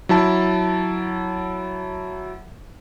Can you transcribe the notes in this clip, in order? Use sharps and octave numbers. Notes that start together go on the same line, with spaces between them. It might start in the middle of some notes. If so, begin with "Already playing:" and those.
F#3 E4 A5